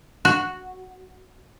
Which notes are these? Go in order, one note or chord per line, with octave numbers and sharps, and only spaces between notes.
F#4